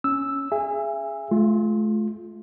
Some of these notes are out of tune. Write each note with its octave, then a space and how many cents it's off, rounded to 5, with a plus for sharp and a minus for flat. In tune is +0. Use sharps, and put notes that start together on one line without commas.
C#4 +0 E6 +0
G#4 +0 E5 +30 G#5 -25
A3 -45 F4 +0